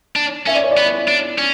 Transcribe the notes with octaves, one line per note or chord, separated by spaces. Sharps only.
D4
C#4 E5
D5
C#5
D5
B3
D4
C#4